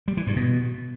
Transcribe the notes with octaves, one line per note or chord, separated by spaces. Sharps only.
G3
E3
G2
B2